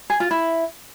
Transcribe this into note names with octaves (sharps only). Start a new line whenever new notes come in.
G#4
F4
E4